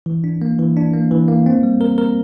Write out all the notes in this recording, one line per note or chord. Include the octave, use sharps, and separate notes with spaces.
E3
D4
A#3
E3
D4
A#3
E3
A#3
C4
G3
A#4
A#4